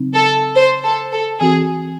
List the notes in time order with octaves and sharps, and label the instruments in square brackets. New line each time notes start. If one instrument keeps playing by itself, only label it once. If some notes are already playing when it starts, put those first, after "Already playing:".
Already playing: [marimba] C#3 F#3 C4 D#4
[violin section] A4
C5
A4
A4
[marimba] E3 C4 F#4 A4 [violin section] G#4